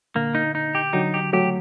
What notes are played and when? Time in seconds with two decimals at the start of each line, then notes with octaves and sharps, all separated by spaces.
0.15 A#2 D3 A#3
0.35 D#4
0.55 D#4
0.75 G4
0.93 D3 F#3 D#4
1.14 G4
1.33 F#3 A3 G4